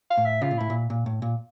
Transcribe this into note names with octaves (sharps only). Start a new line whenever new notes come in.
F5
A2
E5
C#3 F4
A#2
A2 E4
A#2
A#2
A2
A#2